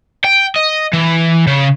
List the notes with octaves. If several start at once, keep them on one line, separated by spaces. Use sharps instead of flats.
G5
D#5
E3
C#3